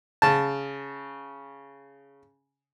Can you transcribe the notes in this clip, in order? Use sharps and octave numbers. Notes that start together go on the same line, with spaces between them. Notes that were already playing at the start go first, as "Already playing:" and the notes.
C#3 A5